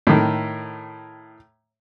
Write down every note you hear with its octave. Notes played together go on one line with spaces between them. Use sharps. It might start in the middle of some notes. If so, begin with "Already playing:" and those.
A2 D#3